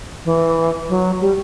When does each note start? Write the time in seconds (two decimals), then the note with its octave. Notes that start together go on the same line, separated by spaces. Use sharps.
0.25 E3
0.89 F#3
1.21 G3